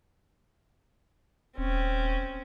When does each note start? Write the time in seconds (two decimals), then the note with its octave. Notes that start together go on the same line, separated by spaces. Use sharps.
1.58 D#1 C4 C#4